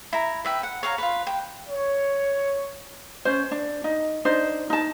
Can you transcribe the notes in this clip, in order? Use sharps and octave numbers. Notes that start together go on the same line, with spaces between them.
E4 A#5
B4 E5 G5
F#5
C#5 F5 F#5 A#5
F4 B4
G5
C#5
C#4 C5
D4
D#4
D4 D#4 C5
D#4 A5